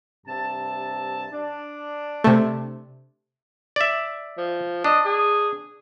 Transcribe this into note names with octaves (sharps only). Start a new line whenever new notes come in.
G2 C3 A5
D4
C3 A3
D5 E5
F3
D4 D#5
G#4